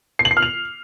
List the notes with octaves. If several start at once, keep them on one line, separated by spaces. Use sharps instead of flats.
C7
F#7
C7
F6
F7